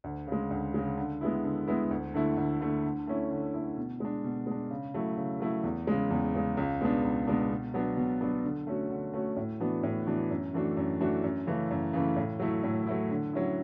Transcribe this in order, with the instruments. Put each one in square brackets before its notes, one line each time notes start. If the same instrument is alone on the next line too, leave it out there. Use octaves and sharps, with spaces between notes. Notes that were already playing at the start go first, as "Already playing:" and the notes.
[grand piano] D2
C#3 G#3
D2
C#3 G#3
D3
G#3 B3 E4
D3
G#3 B3 E4
D2
D3 A3 E4
D2
D3 A3 E4
D3
A3 C#4 E4
D3
A3 C#4 E4
B2
G#3 D4
B2
G#3 D4
C#3
F#3 A3 E4
C#3
F#3 A3 E4
E2
C#3 G#3
E2
C#3 G#3
C#2
B2 G#3 B3 D4
C#2
B2 G#3 B3 D4
B2
F#3 B3 D4
B2
F#3 B3 D4
D3
A3 C#4 F#4
D3
A3 C#4 F#4
A2
E3 B3 D4 F#4
A2
E3 B3 D4 F#4
F#2
E3 A3 D4 F#4
F#2
E3 A3 D4 F#4
F#2
C#3 E3 A3
F#2
C#3 E3 A3
A2
F#3 A3 E4
A2
F#3 A3 E4
D3
F#3 C#4 E4